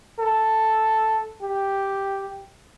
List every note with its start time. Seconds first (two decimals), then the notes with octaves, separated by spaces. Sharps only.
0.20 A4
1.42 G4